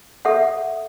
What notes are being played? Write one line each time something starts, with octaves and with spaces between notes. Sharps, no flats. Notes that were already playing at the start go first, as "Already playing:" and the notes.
A4 E5 F#5